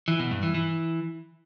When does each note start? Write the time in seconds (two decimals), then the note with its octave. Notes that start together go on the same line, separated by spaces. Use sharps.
0.08 E3
0.19 B2
0.31 G2
0.43 E3
0.54 E3